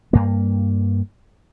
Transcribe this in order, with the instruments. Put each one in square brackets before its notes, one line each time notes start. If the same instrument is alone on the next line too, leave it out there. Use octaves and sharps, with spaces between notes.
[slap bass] G2 A#3